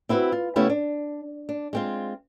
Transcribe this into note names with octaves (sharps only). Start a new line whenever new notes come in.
C4 E4 F#4 A#4 B4
F4
C#3 A3 B3 C#4 E4 G4
D4
D4
G#3 C4 F4